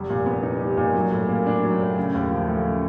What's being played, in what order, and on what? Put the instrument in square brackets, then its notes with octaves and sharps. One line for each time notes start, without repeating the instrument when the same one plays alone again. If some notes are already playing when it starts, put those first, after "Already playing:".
Already playing: [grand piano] F1 G3
A#2
B3
D#4
G3
A#2
F#3
A2
A#3
D4
F#3
A2
C#3
D#2
F3
A3
C#3